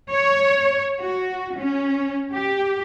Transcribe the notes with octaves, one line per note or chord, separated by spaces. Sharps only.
C#5
F#4
C#4
G4